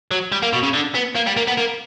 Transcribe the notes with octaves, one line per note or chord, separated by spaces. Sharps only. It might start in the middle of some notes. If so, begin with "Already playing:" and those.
F#3
G3
A#3
B2
C#3
D3
B3
A#3
G3
A#3
B3
A#3